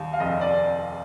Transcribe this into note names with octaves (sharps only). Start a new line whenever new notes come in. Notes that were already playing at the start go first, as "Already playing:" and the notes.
Already playing: D#2 G3
F5
F1 D#5
D5